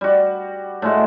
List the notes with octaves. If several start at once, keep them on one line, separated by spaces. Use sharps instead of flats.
G3 F#4
A2 G#3 F#4